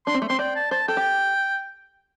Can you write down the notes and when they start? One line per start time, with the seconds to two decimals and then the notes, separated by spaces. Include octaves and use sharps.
0.07 D4 C6
0.14 C4
0.22 A3
0.29 C4 C6
0.39 D5 G5
0.55 A5
0.71 C5 A5
0.88 A4 G5
0.97 G4